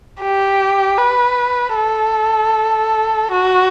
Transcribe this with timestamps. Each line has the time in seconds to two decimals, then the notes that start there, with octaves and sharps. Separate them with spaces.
0.21 G4
0.98 B4
1.76 A4
3.32 F#4